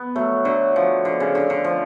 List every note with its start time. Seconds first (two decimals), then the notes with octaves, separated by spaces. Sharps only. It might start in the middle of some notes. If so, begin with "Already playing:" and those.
Already playing: B3
0.16 F#3 A3
0.45 D3 F#3
0.76 F3
1.05 D3
1.20 C#3
1.35 D3
1.50 D3
1.64 F3